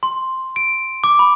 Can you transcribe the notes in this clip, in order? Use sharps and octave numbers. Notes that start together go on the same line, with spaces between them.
C6
D7
D6
B5